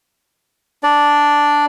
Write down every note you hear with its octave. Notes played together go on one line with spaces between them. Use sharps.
D4 D5